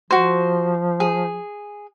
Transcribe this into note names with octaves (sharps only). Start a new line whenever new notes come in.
F3 F#4 C5
G#4